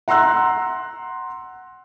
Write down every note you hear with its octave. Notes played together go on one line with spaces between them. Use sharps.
F#5 A#5 C6 E6 F#6